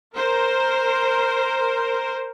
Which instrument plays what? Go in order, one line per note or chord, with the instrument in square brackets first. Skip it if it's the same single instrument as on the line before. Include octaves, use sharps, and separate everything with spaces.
[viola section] A#4 C5